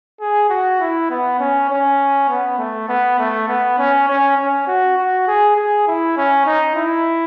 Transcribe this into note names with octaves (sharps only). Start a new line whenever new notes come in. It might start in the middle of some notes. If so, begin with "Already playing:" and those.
G#4
F#4
E4
B3
C#4
C#4
B3
A3
B3
A3
B3
C#4
C#4
C#4
F#4
F#4
G#4
G#4
E4
C#4
D#4
E4